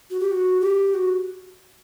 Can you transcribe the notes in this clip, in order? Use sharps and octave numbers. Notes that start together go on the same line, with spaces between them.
F#4
G4
F#4
G4
F#4